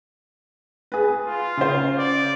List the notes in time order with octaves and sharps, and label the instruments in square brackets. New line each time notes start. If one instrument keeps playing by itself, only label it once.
[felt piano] G#4 B4
[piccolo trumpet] F4
[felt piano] C#3 C5
[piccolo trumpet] D5